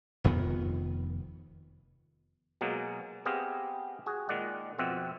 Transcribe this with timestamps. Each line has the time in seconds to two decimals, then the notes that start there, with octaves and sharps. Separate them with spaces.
0.24 F1 F2 D#3 B3
2.61 B2 F#3 G#3 A#3 G#4
3.26 B3 C4 G4 G#4 D#5 F5
4.06 F#4 G#4
4.29 A#2 D#3 G#3 D5 F#5
4.78 F2 B2 C4 E5 F#5